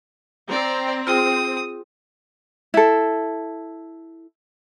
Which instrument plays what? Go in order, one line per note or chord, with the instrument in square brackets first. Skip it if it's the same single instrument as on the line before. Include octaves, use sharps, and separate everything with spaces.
[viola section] C4 [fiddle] D5 A#5
[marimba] F4 G#4 G5 [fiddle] D#6
[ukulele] E4 A4